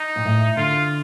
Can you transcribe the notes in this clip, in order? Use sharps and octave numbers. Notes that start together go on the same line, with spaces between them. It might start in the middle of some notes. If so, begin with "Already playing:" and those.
Already playing: D#4
A#2
A2
D3 F4